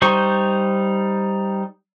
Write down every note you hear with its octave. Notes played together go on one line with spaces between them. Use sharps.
G3 D#4 C5 C#6